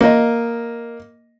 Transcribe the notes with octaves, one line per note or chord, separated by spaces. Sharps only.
A#3 D#5